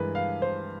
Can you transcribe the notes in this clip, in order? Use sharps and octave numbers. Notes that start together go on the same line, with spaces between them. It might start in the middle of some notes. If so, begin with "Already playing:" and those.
Already playing: G2 E3 G#3 A#4 B4
F5
C5